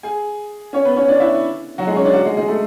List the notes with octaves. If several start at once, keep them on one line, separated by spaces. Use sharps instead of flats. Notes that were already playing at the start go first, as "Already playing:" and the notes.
G#4 G#5
C#4 C#5
B3 B4
C#4 C#5
D4 D5
E4 E5
F#3 F#4
G#3 G#4
C#4 C#5
D4 D5
F#4 F#5
G#3 G#4
G#3 G#4
A3 A4